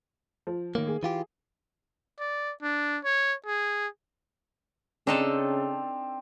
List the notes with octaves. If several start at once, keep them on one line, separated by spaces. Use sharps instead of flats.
F3
A1 D#3 A#3
G#4
E3 F4 G4
D5
D4
C#5
G#4
C#3 C4 D4 D#4 A4